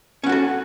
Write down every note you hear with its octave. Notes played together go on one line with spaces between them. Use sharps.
C#4 F#4 A4 F#5